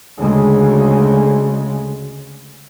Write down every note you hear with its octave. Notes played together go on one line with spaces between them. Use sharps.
D2 C#3 G#3